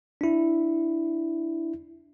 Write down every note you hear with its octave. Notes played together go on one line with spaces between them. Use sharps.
D4 E4